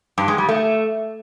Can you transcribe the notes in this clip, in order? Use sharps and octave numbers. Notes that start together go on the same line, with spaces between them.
G2
G#3
G3
A3